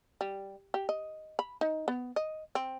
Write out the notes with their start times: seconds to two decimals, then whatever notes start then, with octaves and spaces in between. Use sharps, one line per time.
0.21 G3
0.74 G4
0.89 D#5
1.39 B5
1.61 D#4
1.88 B3
2.16 D#5
2.55 C4